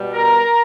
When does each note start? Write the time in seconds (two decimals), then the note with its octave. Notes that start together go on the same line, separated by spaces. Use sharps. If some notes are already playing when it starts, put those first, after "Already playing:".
Already playing: B2 G3 B3
0.14 A#4 A#5